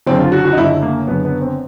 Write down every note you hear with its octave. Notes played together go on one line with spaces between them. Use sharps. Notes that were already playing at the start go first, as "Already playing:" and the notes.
F#1 F#2 D3 C4
F4
F#4
F#4
D#4
F#1 F#2 D3 E4
A#3
F#1 F#2 D3 B3
B3
C4